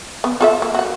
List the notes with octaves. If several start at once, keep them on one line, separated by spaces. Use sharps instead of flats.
B3
F4 A4 E5
A#3
F#4 F#5